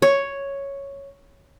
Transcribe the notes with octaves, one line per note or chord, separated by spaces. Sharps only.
C#5